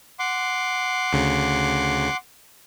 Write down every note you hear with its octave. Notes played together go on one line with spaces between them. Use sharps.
F#5 C6 D6
D2 C#3